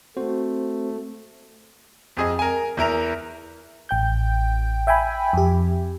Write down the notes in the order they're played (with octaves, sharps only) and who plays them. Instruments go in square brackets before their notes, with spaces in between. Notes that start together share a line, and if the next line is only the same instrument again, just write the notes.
[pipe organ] A3 [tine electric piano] C4 F#4 C5
[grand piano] F2 G#4 D#5
A#4 G#5
E2 E4 A#4 F7
[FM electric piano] A1 G5 G6
E5 G5 G#5 B5
F2 G4